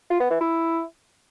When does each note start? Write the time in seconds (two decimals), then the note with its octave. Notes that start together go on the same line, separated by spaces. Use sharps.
0.10 F4
0.20 B3
0.31 E3
0.41 E4